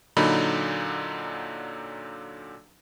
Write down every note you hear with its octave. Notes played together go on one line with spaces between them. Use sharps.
A#2 D3 F#3 D#4 B5